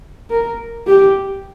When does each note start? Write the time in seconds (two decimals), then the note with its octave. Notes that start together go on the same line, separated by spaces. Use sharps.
0.30 A#4
0.87 G4